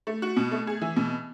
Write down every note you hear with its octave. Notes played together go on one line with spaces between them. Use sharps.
A3
F#4
B2
A3
G#4
E3
B2